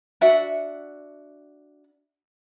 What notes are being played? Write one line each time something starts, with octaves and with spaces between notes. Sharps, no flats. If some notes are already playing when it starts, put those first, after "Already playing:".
D4 F#4 E5 F#5